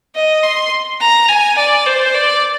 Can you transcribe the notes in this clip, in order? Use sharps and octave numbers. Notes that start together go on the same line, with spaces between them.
D#5
C6
A#5
G#5
D5
C5
D5